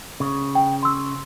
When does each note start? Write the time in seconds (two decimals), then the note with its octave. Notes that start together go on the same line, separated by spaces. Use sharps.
0.20 C#3
0.55 G5
0.83 C6 E6